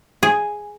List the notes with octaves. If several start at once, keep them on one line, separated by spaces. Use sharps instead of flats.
G#4